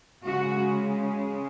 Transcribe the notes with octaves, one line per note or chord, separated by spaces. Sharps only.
C#3 G#3 F#4